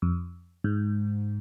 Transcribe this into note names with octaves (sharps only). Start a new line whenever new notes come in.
F2
G#2